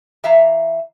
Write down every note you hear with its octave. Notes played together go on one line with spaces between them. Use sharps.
E3 E5 F5 A#5